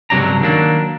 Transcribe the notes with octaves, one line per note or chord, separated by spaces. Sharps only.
C#2 G2 C3 F#3 D4 A#5
D#3 F#3 A#3 D4